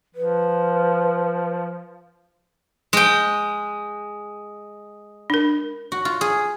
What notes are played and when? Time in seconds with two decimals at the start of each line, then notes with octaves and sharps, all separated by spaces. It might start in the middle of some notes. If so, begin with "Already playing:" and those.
0.15 F3 B4
2.93 G#3 G5
5.30 D4 A#4
5.92 F#4
6.05 F4
6.21 G#4